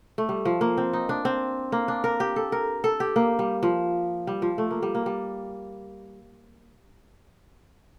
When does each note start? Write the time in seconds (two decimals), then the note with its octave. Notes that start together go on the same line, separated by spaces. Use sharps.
0.18 A3
0.29 G3
0.45 F3
0.61 A#3
0.77 C4
0.93 D#4
1.09 D4
1.25 C4
1.72 A#3
1.88 D4
2.04 A#4
2.20 G4
2.36 A4
2.52 A#4
2.84 A4
3.00 G4
3.16 A#3
3.39 G3
3.63 F3
4.27 G3
4.42 F3
4.58 A3
4.71 A#3
4.83 G3
4.95 A#3
5.06 G3